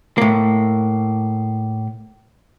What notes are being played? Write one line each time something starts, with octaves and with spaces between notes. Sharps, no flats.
A2 A#3